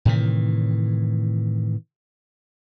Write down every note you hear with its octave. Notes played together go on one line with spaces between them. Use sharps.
A2 C3 D#3 E3